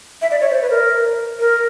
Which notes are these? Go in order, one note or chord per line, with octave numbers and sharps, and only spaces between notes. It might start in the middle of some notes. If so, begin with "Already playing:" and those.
E5
D5
C#5
C5
B4
A#4
A#4